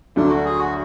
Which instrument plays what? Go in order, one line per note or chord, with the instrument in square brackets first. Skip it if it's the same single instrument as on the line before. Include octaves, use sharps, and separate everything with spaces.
[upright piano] D2 D3 F#3 [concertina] D4
[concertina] F#4
G#4
F#4